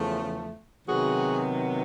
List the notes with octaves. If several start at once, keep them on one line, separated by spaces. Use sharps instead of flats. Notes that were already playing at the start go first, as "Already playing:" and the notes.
Already playing: E2 C#3 F3 A3
C3 D#3 F#3 B3 F#4 G#4